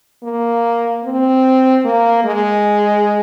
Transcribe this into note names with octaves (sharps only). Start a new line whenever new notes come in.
A#3
C4
A#3
G#3